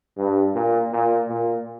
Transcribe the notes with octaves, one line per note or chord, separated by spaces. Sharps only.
G2
A#2
A#2
A#2